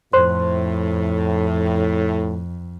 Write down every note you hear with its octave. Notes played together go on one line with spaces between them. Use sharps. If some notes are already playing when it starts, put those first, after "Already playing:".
F2 A2 C5 C6